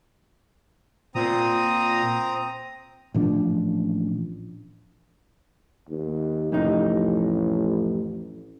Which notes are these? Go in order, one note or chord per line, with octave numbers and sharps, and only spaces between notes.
A#2 C4 A#5 D#6
A1 A#2 F3 D4
D#2
A1 F2 C3 D#4